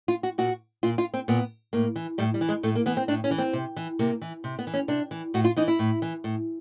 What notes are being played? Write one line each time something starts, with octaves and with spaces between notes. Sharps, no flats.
F4
F#4
A#2 F#4
A#2 F4
F4
C4
A#2 B3
A2 A#3
E3
A2 G3
G3
E3
G#3
A2 A3
A#3
E3 B3
C4
A2 D4
C#4
E3
C4
C3
E3
C3 A#3
E3
C3
B3
E3
C#4
C3 D4
E3
A2 F#4
F4
E3 D#4
E4
A2
E3
A2